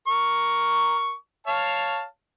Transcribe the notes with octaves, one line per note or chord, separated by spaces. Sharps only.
A#4 C#6
C#5 F5 A5